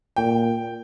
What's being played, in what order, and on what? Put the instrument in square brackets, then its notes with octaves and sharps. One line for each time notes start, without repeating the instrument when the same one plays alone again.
[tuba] A#2 [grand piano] G5